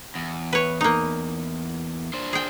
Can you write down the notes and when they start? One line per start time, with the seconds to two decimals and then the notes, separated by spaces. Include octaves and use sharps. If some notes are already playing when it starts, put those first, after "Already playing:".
0.15 E2
0.53 B4 C#5
0.81 A#3 D#4
2.13 D4 C5
2.33 G#4 G5